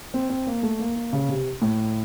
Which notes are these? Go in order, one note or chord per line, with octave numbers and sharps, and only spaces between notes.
C4
C4
A#3
A3
A#3
A#3
C#3
C3
A2